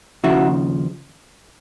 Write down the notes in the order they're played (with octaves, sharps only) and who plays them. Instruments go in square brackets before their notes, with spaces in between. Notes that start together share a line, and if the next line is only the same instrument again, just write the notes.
[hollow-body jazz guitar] D#2 C#3 F3 E4 F#4